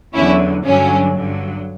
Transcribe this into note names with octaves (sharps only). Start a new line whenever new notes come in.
E2 D3 F#3 C#4 E4
G2 D3 F#3 C#4
G2 D3 F#3